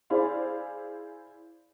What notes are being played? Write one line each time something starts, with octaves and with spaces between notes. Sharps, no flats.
E4 G#4 C5 D5 F5 B5